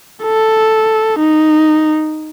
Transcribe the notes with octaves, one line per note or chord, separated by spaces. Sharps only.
A4
D#4